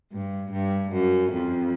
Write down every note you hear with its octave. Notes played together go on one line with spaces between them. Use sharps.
G2
G2
F#2
F2